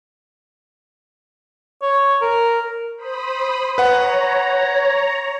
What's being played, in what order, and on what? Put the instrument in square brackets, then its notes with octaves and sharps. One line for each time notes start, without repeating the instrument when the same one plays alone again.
[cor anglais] C#5
A#4
[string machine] C5 B5 D#6
[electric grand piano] B4 F#5 [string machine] C#5 A#5